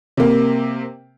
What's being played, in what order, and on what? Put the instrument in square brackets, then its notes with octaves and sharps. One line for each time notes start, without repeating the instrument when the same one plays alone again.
[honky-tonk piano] C3 A#3